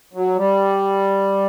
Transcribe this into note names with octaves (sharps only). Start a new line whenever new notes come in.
F#3
G3